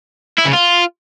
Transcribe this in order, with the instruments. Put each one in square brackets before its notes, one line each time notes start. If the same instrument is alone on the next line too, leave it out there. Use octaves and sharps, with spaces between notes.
[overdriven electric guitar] E4
C#3
F4